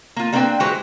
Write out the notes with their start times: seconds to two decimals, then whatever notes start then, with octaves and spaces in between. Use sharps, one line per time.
0.16 A#3 F4
0.33 G3 A#3 C4 D4 B4 G5
0.60 E3 G#3 F#4 G4 B4 C5